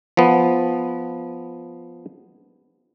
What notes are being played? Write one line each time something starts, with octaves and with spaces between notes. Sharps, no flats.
F3 B3